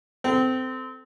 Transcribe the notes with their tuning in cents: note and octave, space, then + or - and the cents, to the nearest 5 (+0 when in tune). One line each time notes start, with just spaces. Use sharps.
C4 -20 A4 +0